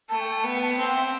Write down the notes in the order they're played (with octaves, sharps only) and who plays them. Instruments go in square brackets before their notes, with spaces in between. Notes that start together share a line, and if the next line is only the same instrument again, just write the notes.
[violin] A3 [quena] A5
[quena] G5
A5
[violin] B3
[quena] G5
A5
G5
[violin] C4 [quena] A5
[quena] F#5
E5
G5